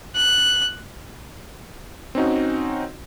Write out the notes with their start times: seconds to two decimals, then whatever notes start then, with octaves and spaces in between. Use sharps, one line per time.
0.16 F#6
2.15 C4 C#4 D#4 F#4